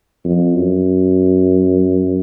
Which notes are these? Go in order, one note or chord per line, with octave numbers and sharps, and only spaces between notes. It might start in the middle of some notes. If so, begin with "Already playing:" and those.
F2
F#2